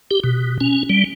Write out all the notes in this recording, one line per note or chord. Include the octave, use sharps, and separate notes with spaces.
G4
B2
C#4
G3